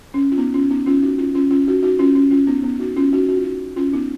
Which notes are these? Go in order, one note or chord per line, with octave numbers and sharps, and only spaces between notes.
C#4
F4
B3 D#4
C#4 F4
B3 D#4
C#4 F4
D#4 F#4
C#4 F4
C#4 F4
C#4 F4
D#4 F#4
D#4 F#4
C#4 F4
C#4
C#4 F4
B3 D#4
B3
D#4 F#4
C#4 F4
D#4 F#4
F#4
F4
D#4 F#4
C#4 F4
B3 D#4